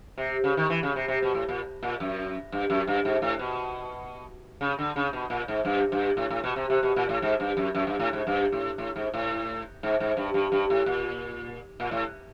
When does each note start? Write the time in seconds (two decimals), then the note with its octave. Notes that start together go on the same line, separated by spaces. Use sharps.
0.18 C3
0.44 C#3
0.57 D#3
0.70 E3
0.83 C#3
0.96 C3
1.08 C3
1.22 B2
1.34 A2
1.48 A#2
1.83 A#2
2.00 F#2
2.52 G2
2.70 F#2
2.87 G2
3.05 G#2
3.22 A2
3.39 B2
4.61 C#3
4.79 D3
4.96 C#3
5.13 B2
5.30 A#2
5.48 G#2
5.65 G2
5.92 G2
6.17 A2
6.30 A2
6.44 B2
6.56 C3
6.70 C3
6.83 B2
6.96 A#2
7.09 A2
7.22 G#2
7.40 G2
7.57 F#2
7.75 F#2
7.87 G2
7.99 A2
8.13 G#2
8.27 G2
8.52 A2
8.78 A2
8.96 G#2
9.14 A2
9.83 G#2
10.00 G#2
10.17 G2
10.34 G2
10.52 G2
10.70 A2
10.86 A#2
11.80 A#2
11.91 A2